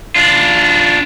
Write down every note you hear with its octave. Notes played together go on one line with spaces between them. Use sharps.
D4 F4